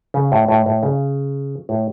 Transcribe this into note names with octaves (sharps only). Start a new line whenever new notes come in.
C#3
A2
A2
A2
C#3
A2